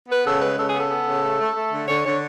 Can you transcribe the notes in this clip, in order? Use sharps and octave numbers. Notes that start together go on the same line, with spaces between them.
B3 B4
C#3 A4
G#3 B4
C#3 A4
G#4
B3 A4
B3
C#3
A3
A3
A3
D3
D3 C#5
D3 C#5